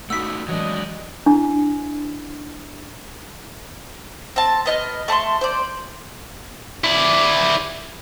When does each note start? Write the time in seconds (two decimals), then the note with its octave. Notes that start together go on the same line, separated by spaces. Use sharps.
0.10 A3 D#4 F#4 F#5 B5 D#6 E6 B6
0.48 E3 F#3 G#3 D4 D#5
1.26 D4 E4
4.36 C4 A5
4.66 B3 D#5 F6
5.08 A3 A5 A#5 C6
5.41 C5 D5
6.84 E4 D5